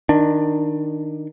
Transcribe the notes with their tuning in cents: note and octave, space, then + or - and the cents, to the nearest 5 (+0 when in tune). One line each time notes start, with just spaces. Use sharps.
D#3 +0 D4 +15